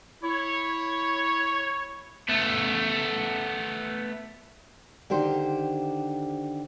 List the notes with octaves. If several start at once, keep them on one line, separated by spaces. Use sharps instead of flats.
E4 C#5
A3 B3
D3 D#3 G4 C5